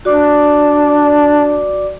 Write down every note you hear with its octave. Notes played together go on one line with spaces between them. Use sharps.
D4 F#4 D5 D6